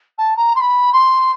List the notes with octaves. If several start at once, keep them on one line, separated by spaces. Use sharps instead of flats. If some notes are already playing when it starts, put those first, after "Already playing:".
A5
A#5
C6
B5
C6